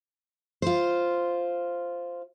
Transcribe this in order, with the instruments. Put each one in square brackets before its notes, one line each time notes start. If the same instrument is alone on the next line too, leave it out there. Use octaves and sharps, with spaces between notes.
[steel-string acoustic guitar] F4 C5